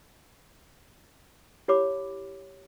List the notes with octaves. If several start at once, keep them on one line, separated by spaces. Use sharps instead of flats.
E4 G4 C#5 B5 D6